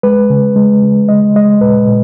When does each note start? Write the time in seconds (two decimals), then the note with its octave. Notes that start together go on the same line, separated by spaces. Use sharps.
0.03 G#3 B4
0.30 C#3
0.56 G#3
0.83 C#3
1.09 G#3 D#5
1.36 G#3 D#5
1.61 A#2 B4
1.88 A#2